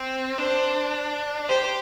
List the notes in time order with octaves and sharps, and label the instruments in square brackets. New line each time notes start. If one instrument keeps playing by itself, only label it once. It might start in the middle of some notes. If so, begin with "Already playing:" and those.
Already playing: [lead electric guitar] C4
[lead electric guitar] D4 [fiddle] C5
[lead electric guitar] G4 [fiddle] C5